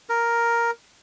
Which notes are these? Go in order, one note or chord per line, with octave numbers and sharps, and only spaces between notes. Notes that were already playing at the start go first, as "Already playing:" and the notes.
A#4